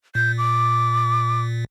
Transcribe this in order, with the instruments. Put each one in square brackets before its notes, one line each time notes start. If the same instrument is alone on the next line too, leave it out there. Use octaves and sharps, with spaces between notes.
[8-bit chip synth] A#2 [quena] G6
[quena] D6